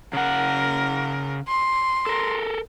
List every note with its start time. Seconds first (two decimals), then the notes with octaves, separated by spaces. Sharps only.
0.13 C#3 A#4 F#5
1.48 C6
2.06 A4 A#4